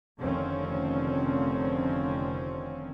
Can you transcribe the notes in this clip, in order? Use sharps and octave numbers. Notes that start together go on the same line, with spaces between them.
F1 D3 D#3 F3 C4 C#4